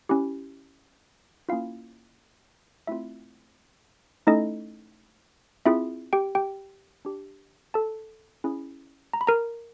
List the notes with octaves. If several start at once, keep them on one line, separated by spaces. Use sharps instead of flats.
C#4 E4 G4
A#3 C#4 E4 F4 F5
A3 C4 E4 F4 E5
A3 C#4 D#4 E4 A4 D#5
C4 E4 F4 G#4 E5
G4 G5
G4 G5
D4 G4
A4 A5
C#4 E4 G#4
A#5
B5
A#4 A#5